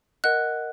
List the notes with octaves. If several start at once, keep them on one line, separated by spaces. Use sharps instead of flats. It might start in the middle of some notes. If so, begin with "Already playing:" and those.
A#4 D#5 F#5 F#6